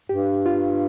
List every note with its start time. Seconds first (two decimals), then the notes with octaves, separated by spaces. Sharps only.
0.09 G2 G4
0.46 F4